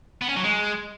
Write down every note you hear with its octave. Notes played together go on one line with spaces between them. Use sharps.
B3
C#4
F#3
G#3